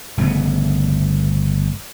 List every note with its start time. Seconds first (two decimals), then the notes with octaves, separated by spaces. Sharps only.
0.18 G1 C#3 A3 B3